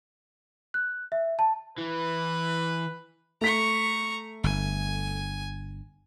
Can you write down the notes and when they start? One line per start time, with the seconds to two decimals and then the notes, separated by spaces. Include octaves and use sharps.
0.74 F#6
1.12 E5
1.39 A5
1.78 E3 B4
3.41 A3 A#5 C#6 B6
4.44 G1 G#5